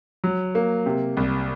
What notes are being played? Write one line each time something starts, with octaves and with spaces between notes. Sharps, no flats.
F#3
A#3
C3
C2